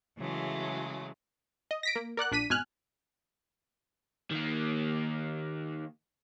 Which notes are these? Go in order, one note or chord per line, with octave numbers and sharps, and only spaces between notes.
C#3 E3 F#3 G#3 A3
D#5
A#6 B6 D7
A#3
A#4 D5 F#5 F#6
A#1 D4 B6 D#7
G#1 B2 G#5 F6 F#6
D#3 A#3